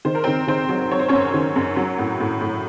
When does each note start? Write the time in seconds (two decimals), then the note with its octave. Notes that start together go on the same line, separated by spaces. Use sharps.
0.05 D#3 C5
0.15 A#4
0.24 C4 C5
0.27 D#3
0.47 D#3 C4 C5
0.69 F#3
0.91 F#3 C#5
0.99 C5
1.08 F#2 C#4 C#5
1.34 D#3
1.56 F#2
1.76 F#3
1.98 A2
2.20 A2
2.41 A2